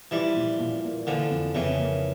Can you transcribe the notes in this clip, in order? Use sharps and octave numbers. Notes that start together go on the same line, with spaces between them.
E3 F3 G3
A#2
A#2
A#3
D3 E3 F3
F2
F2 C#3 E3
A#3